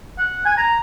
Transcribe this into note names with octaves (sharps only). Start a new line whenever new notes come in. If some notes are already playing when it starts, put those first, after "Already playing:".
F#5
G#5
A#5